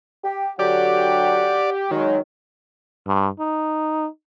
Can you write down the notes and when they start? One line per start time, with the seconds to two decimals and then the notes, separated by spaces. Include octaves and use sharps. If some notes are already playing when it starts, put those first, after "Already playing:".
0.24 G4
0.59 D3 F#3 G4 D5 F#5
1.91 D#3 F#3 G#3
3.07 G2
3.40 D#4